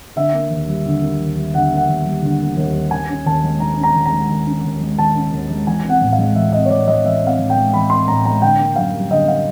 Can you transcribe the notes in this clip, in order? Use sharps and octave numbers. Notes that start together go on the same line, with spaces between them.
D3 E5
A#3
D#2
G3
D3
A#3
D#2
G3
D3 F#5
A#3
F#5
D#2
G3
D3
A#3
D#2
G3
D#3 G#5
C#4
D#2 A5
G#3
D#3 A#5
C#4
A#5
D#2
A#5
G#3
D#3
C#4
D#2
G#3
D#3 A5
C#4
D#2
G#3
E3 G#5
C4 F#5
A2
F5
G#3
E3 E5
C4 D#5
C#5
A2 D5
G#3 D#5
E3 E5
C4
F5
A2
G5
G#3
E3 B5
C4 C6
A2 A#5
G#3 A#5
D3 G5
A#3
F#2 F5
G3
D3 D#5
A#3 F5